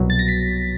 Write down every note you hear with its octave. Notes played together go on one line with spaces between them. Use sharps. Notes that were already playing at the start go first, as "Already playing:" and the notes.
Already playing: C2 B2 F#3
A6
A#6
B6